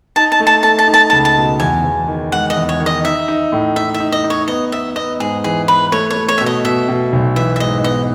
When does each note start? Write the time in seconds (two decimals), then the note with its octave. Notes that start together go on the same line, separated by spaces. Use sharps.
0.16 D#4 A5
0.32 A5
0.40 A3
0.47 A5
0.63 A3 A5
0.79 A5
0.88 D#4
0.94 A5
1.10 C#2 A5
1.25 A5
1.36 B2
1.60 E2 G#5
1.84 E2
2.08 D#3
2.32 G#3 F#5
2.50 D#5
2.56 E2
2.69 C#5
2.80 D#3
2.86 D#5
3.04 D#4 E5
3.28 D#4
3.52 A2
3.76 D#4 E5
3.94 E5
4.00 D#4
4.12 D#5
4.24 D#4
4.30 C#5
4.48 B3 D#5
4.72 B3 E5
4.96 B3 D#5
5.20 G#2 G#4
5.44 E3 G#4
5.68 E3 B4
5.92 A3 C#5
6.10 C#5
6.16 A3
6.29 C#5
6.38 B2 E5
6.46 D#5
6.64 B2 E5
6.89 B2
7.13 B1
7.36 E3 E5
7.56 E5
7.60 G#2 D#5
7.84 B3 D#5